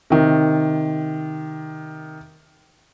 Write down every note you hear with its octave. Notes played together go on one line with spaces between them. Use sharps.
C3 D#3